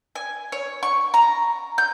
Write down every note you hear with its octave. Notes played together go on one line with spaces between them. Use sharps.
G#5
C#5
C#6
A#5
G6